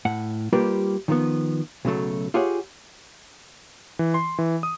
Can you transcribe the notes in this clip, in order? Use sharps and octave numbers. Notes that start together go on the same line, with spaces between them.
A2 F#5
G3 A#3 F4 G4 B4 D5
D#3 F3 B3
B1 C#3 F#3 A3
F4 G4 G#4 C#5 E5 F#5
E3
C6
E3
D#6